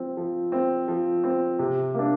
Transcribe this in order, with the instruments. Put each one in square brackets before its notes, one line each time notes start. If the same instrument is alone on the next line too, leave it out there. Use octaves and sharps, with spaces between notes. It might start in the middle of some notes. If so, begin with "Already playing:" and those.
Already playing: [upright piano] F3 C4
F3
C4
F3
C4
C3
A#3 D4